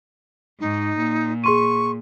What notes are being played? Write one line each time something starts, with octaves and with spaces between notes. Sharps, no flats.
G#2 D#4
A#2
G#4 C6 C#6 D#7